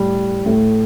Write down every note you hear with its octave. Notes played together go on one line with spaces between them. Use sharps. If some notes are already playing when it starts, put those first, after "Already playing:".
Already playing: A2 G3
A2 A3